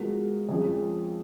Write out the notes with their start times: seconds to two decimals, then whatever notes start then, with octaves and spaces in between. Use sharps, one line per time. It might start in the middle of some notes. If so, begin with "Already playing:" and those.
Already playing: F3 G#3 B3 F#4 A#4
0.49 F2 F3 G#3 C#4 G#4